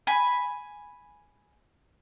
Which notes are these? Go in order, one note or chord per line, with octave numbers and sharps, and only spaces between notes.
G#5 B5